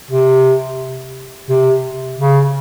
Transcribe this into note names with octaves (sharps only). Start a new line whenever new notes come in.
C3
C3
C#3